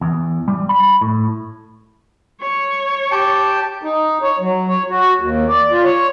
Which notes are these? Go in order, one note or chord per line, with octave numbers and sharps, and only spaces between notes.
E2
G3
B5
A2
C#5
G4 G5 A5
D#4
C#5
F#3
C#5
F#4
D#2
D5
F4
C#5